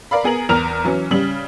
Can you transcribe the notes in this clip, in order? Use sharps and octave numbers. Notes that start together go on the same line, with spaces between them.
A#4 D5 F5 B5
B3 G#4 A#4 F#7
E2 A#4 A#5 F6 F7
E3 F#3 C#4
C#3 G3 F#7